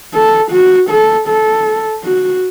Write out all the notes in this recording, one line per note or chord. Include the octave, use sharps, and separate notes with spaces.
A4
F#4
A4
A4
F#4